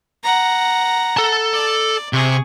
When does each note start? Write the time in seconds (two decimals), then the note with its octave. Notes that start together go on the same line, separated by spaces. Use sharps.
0.23 F#5 A#5
1.17 A4 A5
1.53 D5
2.13 C3 G#4 C#6